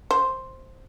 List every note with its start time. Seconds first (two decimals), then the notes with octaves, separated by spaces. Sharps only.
0.11 C5